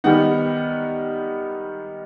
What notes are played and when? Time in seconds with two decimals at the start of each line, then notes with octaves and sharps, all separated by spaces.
0.04 D#3 G3 B3 D#4 F#5